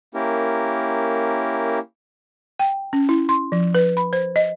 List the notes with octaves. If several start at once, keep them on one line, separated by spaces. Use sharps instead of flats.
A#3 C#4 E4 G4 A#4
G5
C#4
E4
C6
F3
B4
B5
C5
D#5